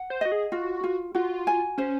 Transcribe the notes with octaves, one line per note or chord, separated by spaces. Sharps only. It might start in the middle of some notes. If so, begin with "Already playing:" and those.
Already playing: F#5
C5
F#4 D#5
G#4
F4 F#4
F4
F4 F#4
G#5
C#4 C5